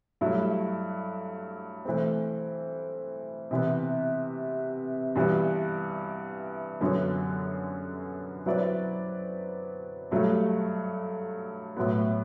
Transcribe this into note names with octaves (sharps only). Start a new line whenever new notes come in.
G2 F#3 A3 E4
E3 A3 C4
C3 E3 B3
G2 E3 G3 B3
F#2 D3 F#3 B3 F#4
F#3 C4 E4 B4 D5
G2 F#3 A3
A2 F#3 B3